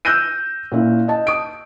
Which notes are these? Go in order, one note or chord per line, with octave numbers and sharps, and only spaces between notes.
E6 F#6 G6 A#6 D#7
A#2 C#4 E4
D#5 A5
D#6 D7